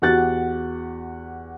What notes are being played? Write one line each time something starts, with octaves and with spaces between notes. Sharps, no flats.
E2 F#4 G4 F#5 F#6 A6